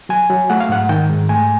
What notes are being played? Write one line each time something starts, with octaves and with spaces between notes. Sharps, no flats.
F#3 G#5
F#3
A3 F#5
F5
G#2 F#5
D#3 G5
G#2
A3 G#5